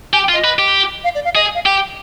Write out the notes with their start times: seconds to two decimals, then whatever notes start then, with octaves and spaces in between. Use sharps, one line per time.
0.13 G4 G#5
0.23 G5
0.29 F4
0.33 D#5
0.44 B4
0.59 G4
1.04 F5
1.15 D5
1.25 F5
1.35 G#4 D#5
1.55 F5
1.65 G4 G5